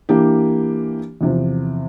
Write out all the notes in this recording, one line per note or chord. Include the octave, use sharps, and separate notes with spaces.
E3 A#3 D4 G4
E2 C3 F3